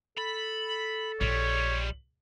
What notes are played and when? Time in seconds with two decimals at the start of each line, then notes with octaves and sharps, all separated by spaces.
0.17 A4 B5
1.21 A#1 G3 G#3 C#5